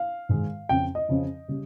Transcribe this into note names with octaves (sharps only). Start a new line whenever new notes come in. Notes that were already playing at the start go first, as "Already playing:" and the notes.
Already playing: F5
G#2 D#3 G#3
F2 C#3 F3 G5
D#5
F2 C#3 F3
C#3 G3